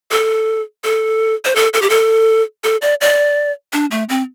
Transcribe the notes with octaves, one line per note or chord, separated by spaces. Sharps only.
A4
A4
C5
A4
A4
G4
A4
A4
D5
D5
D4
A3
C4